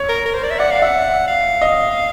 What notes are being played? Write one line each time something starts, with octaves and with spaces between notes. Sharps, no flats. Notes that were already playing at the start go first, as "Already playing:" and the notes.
Already playing: C#5
A#4
A#4
C5
D5
E5
D5 F#5
F5
E5 F#5
F5
D#5